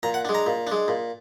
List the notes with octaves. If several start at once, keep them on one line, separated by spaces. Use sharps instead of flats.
A#2 A#5
F#5
G#3 D4
A#5
A#2
G#3 D4
A#2